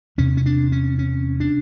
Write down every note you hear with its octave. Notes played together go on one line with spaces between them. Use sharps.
E2 C3 C#4
C#4
D4
C#4
C#4
D4